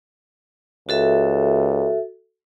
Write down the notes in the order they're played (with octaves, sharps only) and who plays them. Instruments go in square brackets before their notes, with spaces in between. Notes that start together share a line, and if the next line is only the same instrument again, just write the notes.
[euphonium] C#2 [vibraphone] F#4 A4 E5